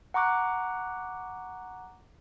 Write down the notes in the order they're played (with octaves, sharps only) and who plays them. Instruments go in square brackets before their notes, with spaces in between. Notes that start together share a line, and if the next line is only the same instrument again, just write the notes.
[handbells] F#5 A#5 C#6 D6 F#6